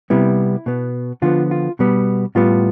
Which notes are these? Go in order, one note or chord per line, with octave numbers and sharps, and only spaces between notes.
C3 G3 B3 E4
B2 B3
D3 F3 B3 F4
F4
B2 G3 B3
A2 G3 B3 F4